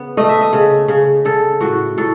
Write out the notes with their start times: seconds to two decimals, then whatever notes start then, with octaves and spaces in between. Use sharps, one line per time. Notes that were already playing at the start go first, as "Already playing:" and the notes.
Already playing: C#3 B3
0.17 A3 D#5
0.29 E5
0.41 D#5
0.53 C#3
0.88 C#3
1.25 C#3 A4
1.61 A2 F#4
1.98 A2 A4